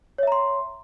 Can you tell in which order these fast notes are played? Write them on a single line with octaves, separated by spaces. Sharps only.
C#5 E5 A#5 C6